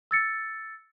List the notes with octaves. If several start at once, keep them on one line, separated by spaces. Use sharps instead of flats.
E6 A6 C#7